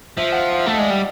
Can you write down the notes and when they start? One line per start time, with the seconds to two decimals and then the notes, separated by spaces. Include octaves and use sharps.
0.17 F3 E5
0.33 F#5
0.38 F5
0.51 F5
0.59 E5
0.66 A3
0.73 D#5
0.78 G#3 D5
0.90 G3